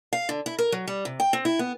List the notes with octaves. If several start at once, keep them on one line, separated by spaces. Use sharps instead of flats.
F5
D3
E4
A#4
F#3
G3
C3
G5
C4
E4
B3